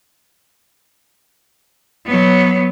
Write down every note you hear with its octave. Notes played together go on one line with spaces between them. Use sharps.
F#3 B3